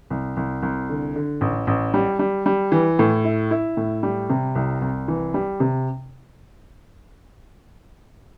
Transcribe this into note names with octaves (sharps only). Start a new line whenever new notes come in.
C2
C2
C2
D3
D3
A1
A1
G3
G3
G3
E3
A2
E4
E4
A2
G3
C3
C2
C2
E3
G3
C3